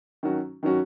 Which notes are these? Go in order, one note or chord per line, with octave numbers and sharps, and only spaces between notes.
D#3 F#3 C#4 F#4
D#3 F#3 C#4 F#4